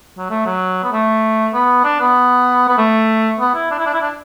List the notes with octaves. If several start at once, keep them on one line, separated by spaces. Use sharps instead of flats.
F#3
A3
F#3
B3
A3
B3
D4
B3
B3
A3
B3
E4
D4
E4
D4
E4
D4